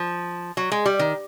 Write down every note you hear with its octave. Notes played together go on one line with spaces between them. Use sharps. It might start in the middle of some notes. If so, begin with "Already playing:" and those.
Already playing: F3
F#3
G#3
G3
D#3